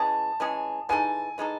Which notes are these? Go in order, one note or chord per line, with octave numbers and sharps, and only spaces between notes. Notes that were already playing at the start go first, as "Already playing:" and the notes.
Already playing: E3 G#3 C#4 G#4 A5
E3 G#3 C#4 G#4
E3 G#3 D#4 A4 G#5
E3 G#3 D#4 A4